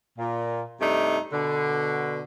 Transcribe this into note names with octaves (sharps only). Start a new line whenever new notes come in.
A#2
G2 C3 A3 D4 D#4
B2 D3